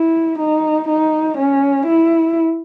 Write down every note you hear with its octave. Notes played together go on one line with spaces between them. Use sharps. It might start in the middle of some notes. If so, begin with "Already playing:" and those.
Already playing: E4
D#4
D#4
C#4
E4